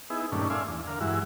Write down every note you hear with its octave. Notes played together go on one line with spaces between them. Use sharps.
B3 D#4 E4 G#4
G2 A#2 D#3 A3 C#4 D4
D5 E5 F5 G#5 C6
E2
D3 A#4 F5
G2 E3 G#3 E4 F#4